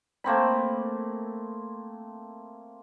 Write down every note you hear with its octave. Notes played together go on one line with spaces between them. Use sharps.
A3 A#3 C4 B5